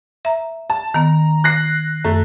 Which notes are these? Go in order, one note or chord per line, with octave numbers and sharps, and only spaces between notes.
E5 A#5
A5
D#3 B3 A#5
F#6 A#6 C7
F#2 A3